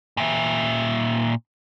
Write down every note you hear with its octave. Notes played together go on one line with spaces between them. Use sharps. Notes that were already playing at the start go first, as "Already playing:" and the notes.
A#2 E5